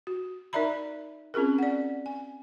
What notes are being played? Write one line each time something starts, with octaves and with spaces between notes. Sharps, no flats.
F#4
D#4 A#4 D5 E5 A#5 B5
C4 C#4 F4 G#4 A#4
D5 F#5
G#5